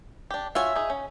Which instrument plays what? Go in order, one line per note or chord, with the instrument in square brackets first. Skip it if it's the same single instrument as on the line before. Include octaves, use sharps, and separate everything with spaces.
[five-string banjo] D4 G4
[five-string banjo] F4 F#4 C#5 [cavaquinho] E5 G#5
[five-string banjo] D#4 G#4
C#4